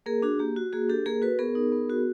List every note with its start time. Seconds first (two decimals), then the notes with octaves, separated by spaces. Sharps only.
0.06 A#3 G#4 A#4
0.22 D4 F#4 G#4
0.39 A#3 G4
0.56 F#4
0.73 A#3 F#4 G#4
0.89 D4 G4 A4
1.06 A#3 G#4 A#4
1.22 F#4 A4 B4
1.39 B3 G#4 A#4
1.55 D#4
1.72 B3
1.90 F#4